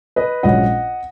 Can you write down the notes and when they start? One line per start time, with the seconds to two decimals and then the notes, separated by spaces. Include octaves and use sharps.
0.16 B4 D#5
0.43 A#1 G#2 F#3 C#4 D#5 F#5